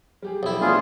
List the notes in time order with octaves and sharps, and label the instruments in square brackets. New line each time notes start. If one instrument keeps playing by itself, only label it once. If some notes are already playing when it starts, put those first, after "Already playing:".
[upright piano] G3 G4 G#4
[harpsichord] B1 E4
[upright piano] A#2 E3 A3 [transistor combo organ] B3 D4 [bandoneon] F4 G#4